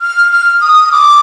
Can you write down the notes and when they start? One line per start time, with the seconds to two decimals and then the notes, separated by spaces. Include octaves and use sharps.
0.01 F6
0.32 F6
0.61 D#6
0.91 D6